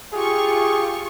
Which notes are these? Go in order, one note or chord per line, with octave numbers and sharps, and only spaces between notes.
F4 G4 G#4 C#6